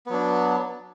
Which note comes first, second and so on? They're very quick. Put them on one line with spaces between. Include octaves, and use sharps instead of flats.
B3 F#3 D4